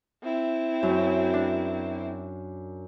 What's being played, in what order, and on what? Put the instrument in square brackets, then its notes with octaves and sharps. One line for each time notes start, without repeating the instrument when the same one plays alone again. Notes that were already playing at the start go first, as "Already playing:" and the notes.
[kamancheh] C4 E4
[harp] F#2
D4